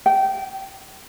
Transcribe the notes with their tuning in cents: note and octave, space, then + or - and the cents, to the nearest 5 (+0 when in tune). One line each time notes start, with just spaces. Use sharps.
G5 -20